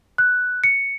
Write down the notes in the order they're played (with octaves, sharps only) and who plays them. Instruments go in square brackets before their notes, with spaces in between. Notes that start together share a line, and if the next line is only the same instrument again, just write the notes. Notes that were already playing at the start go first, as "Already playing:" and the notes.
[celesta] F#6
C#7